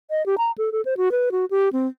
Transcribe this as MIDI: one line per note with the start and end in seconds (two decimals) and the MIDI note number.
0.10 0.25 75
0.26 0.35 67
0.38 0.51 82
0.58 0.70 69
0.72 0.81 69
0.85 0.94 72
0.97 1.11 66
1.12 1.29 71
1.32 1.45 66
1.51 1.69 67
1.73 1.87 60